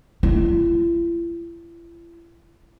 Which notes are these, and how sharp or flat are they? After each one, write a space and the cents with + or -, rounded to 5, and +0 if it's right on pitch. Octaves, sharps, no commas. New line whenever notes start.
E4 +45